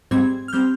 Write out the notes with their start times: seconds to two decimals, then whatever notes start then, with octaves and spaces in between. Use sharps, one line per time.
0.11 G#2 G3 C4 G#6
0.48 F6
0.53 G3 C4 G6